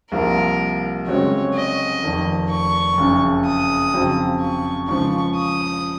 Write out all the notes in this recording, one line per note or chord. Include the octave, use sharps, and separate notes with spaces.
C2 C3 F3 A#3 A#4
F#2 C#3 G#3 C4 F#4 C#5
D#5
F1 F2 D#3
C#6
F#1 F2 C#3
D#6
F2 C#3 F#3 C4
C#6
C#2 C#3 F3 C#6
D#6